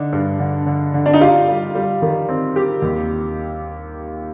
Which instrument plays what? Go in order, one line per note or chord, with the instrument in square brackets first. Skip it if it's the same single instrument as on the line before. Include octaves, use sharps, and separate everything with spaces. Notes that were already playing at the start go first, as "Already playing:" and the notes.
Already playing: [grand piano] D3 D4 [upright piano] D#4
[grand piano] G2
D3
D3
D3
[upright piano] D4
D#4
[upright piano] F4 [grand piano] G4
[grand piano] G3
G3
D#3
C4
G4
D#2